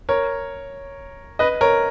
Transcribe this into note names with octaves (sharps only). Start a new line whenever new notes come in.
A#4 C#5
B4 D#5
A#4 C#5